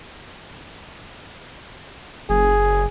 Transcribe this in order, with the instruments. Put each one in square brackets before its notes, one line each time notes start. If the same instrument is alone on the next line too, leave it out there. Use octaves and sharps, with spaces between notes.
[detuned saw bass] F#1 [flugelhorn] G#4